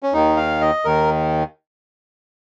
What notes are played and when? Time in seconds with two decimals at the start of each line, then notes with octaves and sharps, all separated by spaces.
0.03 C#4
0.13 D#2 D#3 D#4
0.37 F5
0.61 D#5
0.85 D#2 D#3 A#4